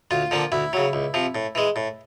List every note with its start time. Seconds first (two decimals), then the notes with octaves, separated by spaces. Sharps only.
0.11 D2 F4
0.31 D3 F3 A#3
0.52 D2 E4
0.73 C#3 F#3
0.93 C#2
1.14 C3 F3
1.35 A2
1.55 E3 G#3
1.76 A2